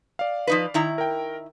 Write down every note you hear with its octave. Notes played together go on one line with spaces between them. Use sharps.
D5 F5
F3 D#4 B4
D#3 E4 A#5
A#4 G5